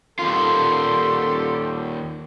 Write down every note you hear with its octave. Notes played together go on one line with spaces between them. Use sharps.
D#2 F4 G4 A4 C6